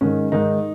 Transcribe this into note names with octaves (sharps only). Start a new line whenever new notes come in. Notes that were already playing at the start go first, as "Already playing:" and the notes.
G#2 D#3 C#4
G#2 D#3 D#4